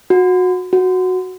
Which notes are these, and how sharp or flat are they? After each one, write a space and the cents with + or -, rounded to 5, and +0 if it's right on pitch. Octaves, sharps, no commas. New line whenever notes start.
F#4 -20
F#4 -5